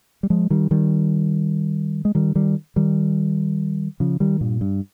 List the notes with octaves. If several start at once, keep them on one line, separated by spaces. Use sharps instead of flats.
G3
F3 G#3
D#3 G3
D#3 G3
G#3
D#3 G3
D#3 G3
D#3 G3
C#3 F3
D#3 G3
G2 A#2
G2